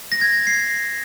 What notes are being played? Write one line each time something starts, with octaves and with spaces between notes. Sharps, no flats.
A#6
G#6
C7